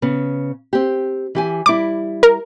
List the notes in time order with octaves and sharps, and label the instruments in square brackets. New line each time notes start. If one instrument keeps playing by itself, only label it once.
[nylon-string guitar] C#3 B3
C4 G4
E3 G4 G#5
[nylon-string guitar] G3 E4 [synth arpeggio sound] D6
[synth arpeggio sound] A#4